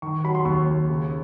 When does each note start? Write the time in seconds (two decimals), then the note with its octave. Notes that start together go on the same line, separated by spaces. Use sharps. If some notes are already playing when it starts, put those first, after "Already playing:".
0.02 D#3 C#6
0.24 F#3 B5
0.35 C6
0.45 D#2 C#6
0.67 D#2
0.89 C#3